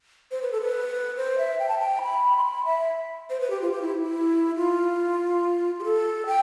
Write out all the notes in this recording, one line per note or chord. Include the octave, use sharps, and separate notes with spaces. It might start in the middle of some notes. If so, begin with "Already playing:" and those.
C5
B4
A4
B4
C5
E5
G5
A5
G5
B5
C6
B5
E5
C5
B4
G4
F4
G4
E4
E4
F4
G4
A4
G5